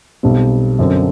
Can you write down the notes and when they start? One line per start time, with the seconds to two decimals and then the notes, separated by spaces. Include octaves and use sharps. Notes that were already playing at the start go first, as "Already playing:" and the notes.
0.23 B1 B2 G3 C4
0.79 F#2 D3 F#3 C4